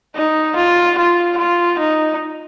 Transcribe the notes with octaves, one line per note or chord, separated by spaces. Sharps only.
D#4
F4
F4
F4
D#4